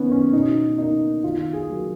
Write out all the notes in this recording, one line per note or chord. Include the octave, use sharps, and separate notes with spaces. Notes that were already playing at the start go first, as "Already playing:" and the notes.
Already playing: D#3 A#3 B3 C#4 D#4
C#4
B2 D#4
A#3 D#4
D#3 F4
G#4
F#3 A#3